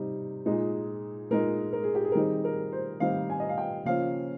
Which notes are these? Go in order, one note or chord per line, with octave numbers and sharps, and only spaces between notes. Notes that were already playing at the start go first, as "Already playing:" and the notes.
Already playing: C3 G3 D#4
A#2 G#3 D#4
A#2 G#3 D#4 A#4
A#4
G#4
G4
G#4
A#4
D#3 G3 C4 D#4 G#4
A#4
C5
D#3 G3 C4 D#4 F5
G#5
D#5
F5
G5
C#3 F3 A#3 C#4 F5